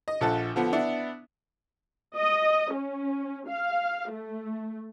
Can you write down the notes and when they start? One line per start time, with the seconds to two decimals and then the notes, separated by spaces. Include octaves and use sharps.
0.08 D#5
0.21 A#1 F3 A4 F#5 A5
0.56 D3 F3 B3
0.73 B3 D4 E4
2.16 D#5
2.73 C#4
3.48 F5
4.11 A3